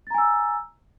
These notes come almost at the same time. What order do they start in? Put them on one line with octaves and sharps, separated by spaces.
A6 A#5 G#5 E6